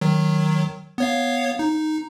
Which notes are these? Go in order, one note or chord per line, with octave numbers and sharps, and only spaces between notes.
D#3 F#3
B3 C#5 F5
D#4